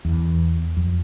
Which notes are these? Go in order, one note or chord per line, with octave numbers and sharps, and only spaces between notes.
E2
F2